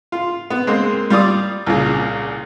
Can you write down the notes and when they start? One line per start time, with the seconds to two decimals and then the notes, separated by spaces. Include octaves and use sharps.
0.12 F4
0.50 B3
0.67 G#3 A#3 C4
1.10 G3 F4 D5 D#6
1.66 C2 A#2 C#3